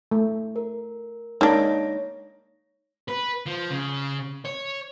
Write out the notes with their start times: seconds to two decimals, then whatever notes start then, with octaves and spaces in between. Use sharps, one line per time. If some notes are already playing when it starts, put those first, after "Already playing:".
0.11 A3
0.56 A#4
1.41 G#3 A#3 D4 D#4 C#5 A#6
3.08 B4
3.46 F3
3.70 C#3
4.45 C#5